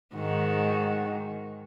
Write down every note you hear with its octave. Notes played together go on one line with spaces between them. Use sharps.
G#2 D#3 F#4